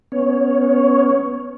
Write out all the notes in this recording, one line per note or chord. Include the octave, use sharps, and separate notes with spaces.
B3 C#4 C#5